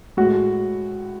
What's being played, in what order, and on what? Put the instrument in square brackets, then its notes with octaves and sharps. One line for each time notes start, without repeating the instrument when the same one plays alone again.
[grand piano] A2 G#3 F#4